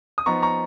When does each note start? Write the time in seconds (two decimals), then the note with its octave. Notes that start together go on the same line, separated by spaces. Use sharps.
0.18 D#6
0.26 F3 B3 D#4 A#5 C#6
0.42 A#5 C#6